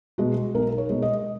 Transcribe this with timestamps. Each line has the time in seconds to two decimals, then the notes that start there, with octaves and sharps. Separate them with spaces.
0.18 B2 G#3 F#4
0.54 B1 A#4
0.78 C#5
0.90 B2 G#3
1.02 D#5